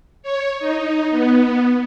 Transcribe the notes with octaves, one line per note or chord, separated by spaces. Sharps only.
C#5
D#4
B3